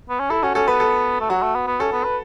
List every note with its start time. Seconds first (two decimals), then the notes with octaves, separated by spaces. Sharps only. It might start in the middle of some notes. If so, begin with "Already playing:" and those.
0.09 B3
0.20 C#4
0.30 E4 A4
0.43 C#4 F#4
0.55 C#4 A4
0.68 B3 B4
0.80 A4
1.21 A3
1.30 F#3 F#4
1.43 A3
1.55 B3
1.67 B3
1.80 C#4 A4
1.92 B3
2.05 B4